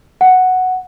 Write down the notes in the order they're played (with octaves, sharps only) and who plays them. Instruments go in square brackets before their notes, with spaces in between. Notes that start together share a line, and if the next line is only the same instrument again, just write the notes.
[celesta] F#5